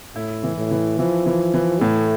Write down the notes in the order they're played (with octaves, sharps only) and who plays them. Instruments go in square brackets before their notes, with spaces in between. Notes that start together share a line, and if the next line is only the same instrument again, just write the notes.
[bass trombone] A2 [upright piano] E4
[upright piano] E3
[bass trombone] A2
[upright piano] E3
[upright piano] E3 [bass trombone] F3
[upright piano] E3
E3
[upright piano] A2 [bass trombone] A3